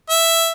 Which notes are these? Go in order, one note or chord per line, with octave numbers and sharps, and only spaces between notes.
E5